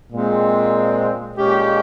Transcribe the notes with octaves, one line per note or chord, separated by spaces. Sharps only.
A#2 G#3 C4
A#2 G#3 C#4 G4